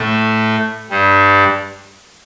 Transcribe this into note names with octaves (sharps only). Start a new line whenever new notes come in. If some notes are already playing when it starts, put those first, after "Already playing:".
Already playing: A2 A3
G2 G3